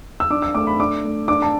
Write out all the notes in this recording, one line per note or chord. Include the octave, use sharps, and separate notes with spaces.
E6
D4 D6
E6
A3 D6
B5
D4 D6
A3
D4 D6
A5